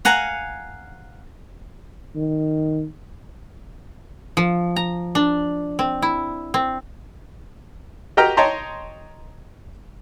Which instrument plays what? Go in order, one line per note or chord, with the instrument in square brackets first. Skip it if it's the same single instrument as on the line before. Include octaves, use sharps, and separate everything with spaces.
[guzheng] F5 F#5 G#5 A#5
[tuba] D#3
[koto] F3
A#5
D4
C4
E4
C4
[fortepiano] F#4 G4 D#5 G5 A#5 F6
C#5 D#5 G5 A5 A#5 C6